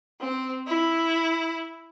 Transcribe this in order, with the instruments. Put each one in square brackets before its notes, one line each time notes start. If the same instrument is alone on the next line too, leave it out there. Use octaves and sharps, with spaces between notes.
[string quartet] C4
E4